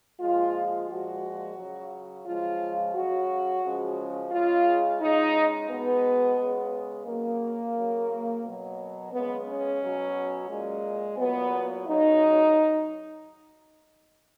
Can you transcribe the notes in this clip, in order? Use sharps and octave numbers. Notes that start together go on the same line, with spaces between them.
A#2 F3 G#3 F4
A#2 F3 G#3 F#4
C#3 F#3
C#3 F3 G#3 F4
C#3 F#3 F#4
C#3 F3 G#3
C#3 G#3 F4
C#3 G#3 D#4
B2 G#3 B3
C#3 G#3
C#3 F#3 A#3
C#3 F#3
B2 F#3
C#3 G#3 B3
C#4
B2 F#3
A#2 G#3
A#2 F#3 B3
C#3 F#3 D#4